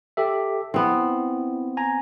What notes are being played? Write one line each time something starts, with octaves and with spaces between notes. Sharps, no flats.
G4 A4 E5
B3 C4 E4
G#5 A#5